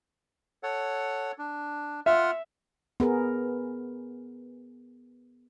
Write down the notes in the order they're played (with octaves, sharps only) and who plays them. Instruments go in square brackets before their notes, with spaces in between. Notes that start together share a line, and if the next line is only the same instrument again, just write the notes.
[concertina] A4 C#5 F#5
D4
[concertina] F4 F#5 F6 [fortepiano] E5
[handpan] B3 G#4 A#4